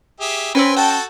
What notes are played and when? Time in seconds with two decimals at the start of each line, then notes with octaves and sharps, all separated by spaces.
0.20 G4 G#4 E5
0.55 C4 C#4 B4 C#5 G5 G#5
0.76 F#4 A4 G5 A5